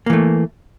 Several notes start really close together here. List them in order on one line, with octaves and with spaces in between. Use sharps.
A#3 E3 A3